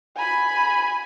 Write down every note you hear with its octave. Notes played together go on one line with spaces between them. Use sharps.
G#5 B5